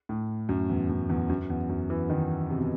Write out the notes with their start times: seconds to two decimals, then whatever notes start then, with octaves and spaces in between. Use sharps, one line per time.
0.09 A2
0.49 F#2
0.70 E2
0.89 F#2
1.10 E2
1.29 F#2
1.50 E2
1.69 F#2
1.90 E3
2.10 D#3
2.50 C3
2.58 B2